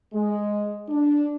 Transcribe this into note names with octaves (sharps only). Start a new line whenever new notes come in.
G#3
D4